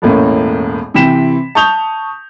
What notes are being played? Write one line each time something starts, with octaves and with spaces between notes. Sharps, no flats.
E1 A1 A2 A#3 C#4
C3 E3 G5 B6 E7
A5 C#6 D#6 G6 F7 G7